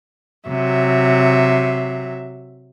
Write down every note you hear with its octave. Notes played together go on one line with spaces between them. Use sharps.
C3 F#3 E5